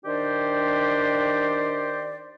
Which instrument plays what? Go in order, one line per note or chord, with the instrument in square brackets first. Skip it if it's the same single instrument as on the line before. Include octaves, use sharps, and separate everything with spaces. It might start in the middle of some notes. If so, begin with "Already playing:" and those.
[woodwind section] D#3 D4 G4 C5 D5